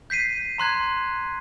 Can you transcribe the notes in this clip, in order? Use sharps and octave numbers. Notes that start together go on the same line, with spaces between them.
G6 B6 C7 D#7
A#5 C6 F#6 G#6